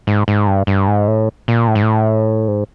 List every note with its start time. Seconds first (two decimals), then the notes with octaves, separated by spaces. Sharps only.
0.07 G#2
0.28 G#2
0.47 G2
0.67 G2
0.88 G#2
1.08 A2
1.48 A#2
1.68 A2
1.75 G#2
1.83 A2
2.48 G#2